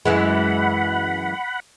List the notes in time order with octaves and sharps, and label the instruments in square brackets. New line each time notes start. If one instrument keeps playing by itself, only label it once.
[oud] F#2 E3 G#3 [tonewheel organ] F#5 B5